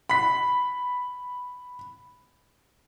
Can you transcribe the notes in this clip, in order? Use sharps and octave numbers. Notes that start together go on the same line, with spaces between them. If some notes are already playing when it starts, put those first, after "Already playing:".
B5 B6